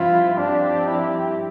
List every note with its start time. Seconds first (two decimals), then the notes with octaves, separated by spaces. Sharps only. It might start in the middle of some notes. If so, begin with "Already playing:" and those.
Already playing: G2 F3 C4 E4 F4
0.37 G2 F3 C4 D4 G4
0.88 E4